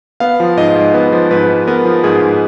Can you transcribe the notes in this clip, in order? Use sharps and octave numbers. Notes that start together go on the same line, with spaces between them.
B3 F5
F3
G#2 D#5
G#2
B3
F3
G#2 B4
G#2
B3 A#4
F3
G#2 G#4
G#2